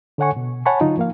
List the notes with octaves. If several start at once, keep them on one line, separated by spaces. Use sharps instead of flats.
D3 A4 C#5 F#5 G#5 C#6
B2
C#5 F#5 G#5 A5 B5 C#6
D3 F#3 D#4 F4
F3 A#3 F5